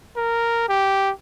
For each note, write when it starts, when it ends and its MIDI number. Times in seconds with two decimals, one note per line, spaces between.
0.17 0.68 70
0.69 1.11 67